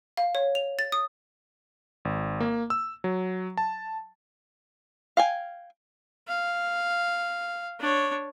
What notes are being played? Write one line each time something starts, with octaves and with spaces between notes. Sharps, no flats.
F5
C#5
F7
A6
D#6
G#1
A#3
E6
F#3
A5
F5 G5 G#5
F5
D4 C#5